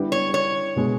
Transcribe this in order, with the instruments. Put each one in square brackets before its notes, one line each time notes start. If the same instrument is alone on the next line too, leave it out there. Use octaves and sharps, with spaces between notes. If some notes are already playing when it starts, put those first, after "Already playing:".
Already playing: [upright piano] D3 G3 B3 E4 G4
[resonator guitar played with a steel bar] C#5
C#5
[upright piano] B2 G#3